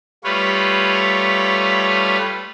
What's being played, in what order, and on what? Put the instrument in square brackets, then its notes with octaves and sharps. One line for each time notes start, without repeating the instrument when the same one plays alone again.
[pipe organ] G3 A3 F4 B4 C#5